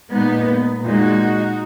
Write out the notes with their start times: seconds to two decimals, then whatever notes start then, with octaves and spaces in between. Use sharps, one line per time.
0.12 A#2 G#3 B3 D#4
0.83 A#2 G#3 D#4 F#4